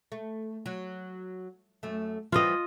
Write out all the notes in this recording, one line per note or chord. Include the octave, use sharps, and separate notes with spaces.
A3
F#3
F#2 A3
E3 F3 G3 F4 D#5